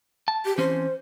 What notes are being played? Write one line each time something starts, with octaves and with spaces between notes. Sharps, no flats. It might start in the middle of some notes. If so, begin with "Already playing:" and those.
A5
G4
E3 C4 C#4 C5